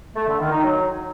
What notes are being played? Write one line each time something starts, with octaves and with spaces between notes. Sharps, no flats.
A3
D3
D#3
D#4
F#3